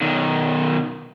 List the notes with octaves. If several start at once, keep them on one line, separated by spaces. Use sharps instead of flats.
B1 D#3